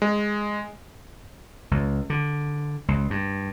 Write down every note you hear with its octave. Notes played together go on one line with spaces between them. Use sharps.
G#3
C#2
D3
C#2
G2